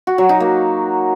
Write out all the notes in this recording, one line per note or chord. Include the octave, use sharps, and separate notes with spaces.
F#4
F#3
D#4
A#3